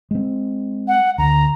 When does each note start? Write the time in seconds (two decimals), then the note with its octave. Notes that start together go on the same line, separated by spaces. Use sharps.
0.11 G#3 C4
0.88 F#5
1.18 D2 A#5